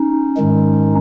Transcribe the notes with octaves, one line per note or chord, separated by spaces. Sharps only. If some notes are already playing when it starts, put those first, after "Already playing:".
Already playing: C#4 D#4
G#2 D#3 G#3